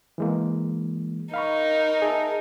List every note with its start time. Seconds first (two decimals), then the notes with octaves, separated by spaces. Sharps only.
0.18 E3 G#3 A#3
1.34 D#4 A#4 F5 B5 C#6
2.02 G#4 E5 A5